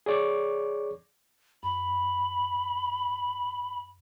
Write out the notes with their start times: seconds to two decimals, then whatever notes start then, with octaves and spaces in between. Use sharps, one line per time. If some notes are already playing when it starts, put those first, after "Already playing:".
0.06 G#4 C#5 D5 C#6 D6
1.63 F#2 B5